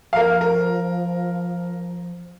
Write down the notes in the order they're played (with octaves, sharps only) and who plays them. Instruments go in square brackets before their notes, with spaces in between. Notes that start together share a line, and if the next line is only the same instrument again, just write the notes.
[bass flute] F3 [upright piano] A#4 F5
[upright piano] A#4